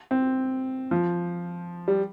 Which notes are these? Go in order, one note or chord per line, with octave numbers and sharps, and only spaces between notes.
C4
F3
G3